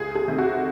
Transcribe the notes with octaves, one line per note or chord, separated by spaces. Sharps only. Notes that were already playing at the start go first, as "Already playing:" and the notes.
Already playing: C#2 G#4
G#4
C3 D#3 A3
F#4